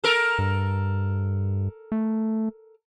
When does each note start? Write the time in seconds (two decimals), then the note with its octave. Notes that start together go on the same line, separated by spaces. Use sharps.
0.04 A4 A#4
0.39 G2
1.92 A3